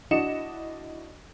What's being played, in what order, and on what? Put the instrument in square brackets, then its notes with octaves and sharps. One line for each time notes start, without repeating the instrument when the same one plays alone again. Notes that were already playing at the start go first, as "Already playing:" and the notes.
[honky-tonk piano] D4 E4 F#4 D#5 C#7 E7